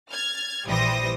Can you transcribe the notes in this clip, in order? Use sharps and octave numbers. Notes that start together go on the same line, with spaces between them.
F6 G#6 A6
A#1 E3 G3 C5 D#6 A#6